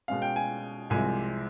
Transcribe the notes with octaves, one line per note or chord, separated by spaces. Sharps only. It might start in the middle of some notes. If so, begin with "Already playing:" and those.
B2 G#3 C#4 F5
G5
G#5
C2 C3 F3 G#3 G#5